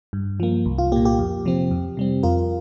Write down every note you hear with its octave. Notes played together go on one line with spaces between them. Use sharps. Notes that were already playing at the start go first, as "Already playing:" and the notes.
G2
F3 A#3
C2
F4
A#2 A#3 G4
G4
F2
C3 F3 C4
F2
C3 G3 C4
F2 F4 A#4